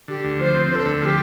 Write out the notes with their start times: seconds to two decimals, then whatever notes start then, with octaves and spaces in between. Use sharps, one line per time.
0.08 D3 G4
0.25 D2
0.39 F3 C5
0.54 C4
0.70 D3 A4 C5
0.86 D2
1.01 F3 G4 A4